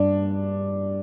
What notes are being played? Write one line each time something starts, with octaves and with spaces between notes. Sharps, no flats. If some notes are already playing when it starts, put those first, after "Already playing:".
Already playing: G2 D4